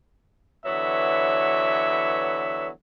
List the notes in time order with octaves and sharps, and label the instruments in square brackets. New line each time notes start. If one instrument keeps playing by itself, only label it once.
[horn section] D3 E3 F#3 B3 C#5 E5